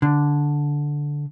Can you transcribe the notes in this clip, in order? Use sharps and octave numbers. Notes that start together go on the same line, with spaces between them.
D3